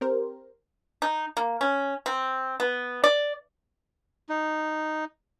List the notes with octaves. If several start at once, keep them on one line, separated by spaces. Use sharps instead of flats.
C4 G4 A#4 C5
D#4
A#3
C#4
C4
B3
D5
D#4